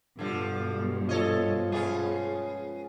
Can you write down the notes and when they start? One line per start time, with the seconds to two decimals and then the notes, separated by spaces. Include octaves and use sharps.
0.19 G2 B2 D3 F3
1.09 F3 A4 C#5 D#5
1.72 G#3 B3 C#4